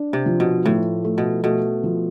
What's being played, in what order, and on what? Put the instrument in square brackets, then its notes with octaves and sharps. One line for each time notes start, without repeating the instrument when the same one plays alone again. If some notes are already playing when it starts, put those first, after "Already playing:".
Already playing: [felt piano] D4
[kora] C3
[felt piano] F3
[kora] B2
[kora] A2 [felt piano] F3
[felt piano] A3
[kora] B2
[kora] B2 [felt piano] A3
[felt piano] F3